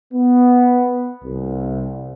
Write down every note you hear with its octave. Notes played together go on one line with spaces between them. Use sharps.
B3
C2